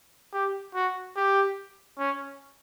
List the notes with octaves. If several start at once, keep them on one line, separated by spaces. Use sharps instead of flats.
G4
F#4
G4
C#4